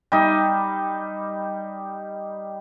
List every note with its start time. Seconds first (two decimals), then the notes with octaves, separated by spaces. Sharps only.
0.12 G3 D#4